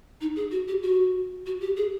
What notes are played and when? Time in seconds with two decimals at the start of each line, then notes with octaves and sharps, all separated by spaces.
0.21 D#4
0.36 G#4
0.51 F#4
0.68 G4
0.83 F#4
1.46 F#4
1.61 G4
1.77 G#4